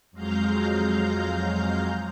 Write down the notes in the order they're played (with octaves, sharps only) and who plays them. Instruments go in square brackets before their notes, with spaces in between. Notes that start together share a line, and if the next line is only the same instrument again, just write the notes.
[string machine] F2 F#3 G#3 F5 A#5 G6